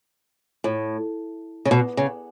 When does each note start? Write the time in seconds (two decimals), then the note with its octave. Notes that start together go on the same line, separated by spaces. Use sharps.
0.64 A2
1.65 C#3
1.71 B2
1.97 C#3